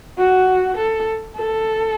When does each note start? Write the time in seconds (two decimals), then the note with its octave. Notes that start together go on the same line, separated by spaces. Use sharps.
0.18 F#4
0.78 A4
1.37 A4